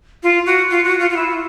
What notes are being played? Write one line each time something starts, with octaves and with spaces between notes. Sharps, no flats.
F4
F#4
F4
F#4
F4
F4
E4